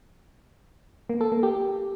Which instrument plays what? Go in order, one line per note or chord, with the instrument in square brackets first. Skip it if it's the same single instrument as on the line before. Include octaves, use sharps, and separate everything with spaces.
[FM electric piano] A#3
A4
A#3
G4